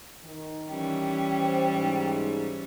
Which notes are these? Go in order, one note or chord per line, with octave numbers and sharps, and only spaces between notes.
D#3
E3 G3 C#4 G5
C5
G#2